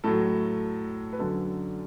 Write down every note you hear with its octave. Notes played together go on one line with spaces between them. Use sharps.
A2 F#3 A4
B4
F#2 D3 F#3 A4